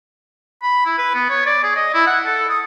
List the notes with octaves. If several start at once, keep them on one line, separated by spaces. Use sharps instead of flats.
B5
E4
B4
B3
C#5
D5
G#4
D#5
E4
F#5
A4
D#6